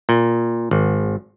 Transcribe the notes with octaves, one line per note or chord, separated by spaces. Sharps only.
A#2
G#1